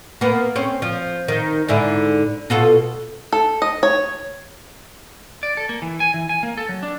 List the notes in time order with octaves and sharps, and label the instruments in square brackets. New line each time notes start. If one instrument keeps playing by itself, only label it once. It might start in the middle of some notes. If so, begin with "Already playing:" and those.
[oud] A#3 B3
C4 C#4
F3
D#3
G#2 D3 E4
B2 F4 A4
[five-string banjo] A4
D#5
C#5
[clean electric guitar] D5
A4
A#3
E3
G#5
E3
G#5
A#3
A4
F#3
D4